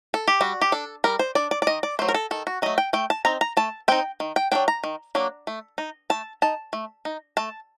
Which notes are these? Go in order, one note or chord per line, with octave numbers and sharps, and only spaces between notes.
A4
G4
G3 F#4
G4
D4 A4
G3 A#4
C5
D4 D5
D5
D5
D#3 D#5
D5
F#3 A3 C5
A#4
A4
D#3 A4
F#4
F#3 A3 D#5
G5
A3 G5
A5
C4 D#4 A#5
A#5
A3 A5
C4 D#4 G5
D#3
G5
F#3 A#3 D4 G5
A#5
D#3
F#3 A#3 D4
A3
D#4
A3 A5
D#4 A5
A3
D#4
A3 A5